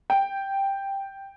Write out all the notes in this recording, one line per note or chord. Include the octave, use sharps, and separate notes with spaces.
G5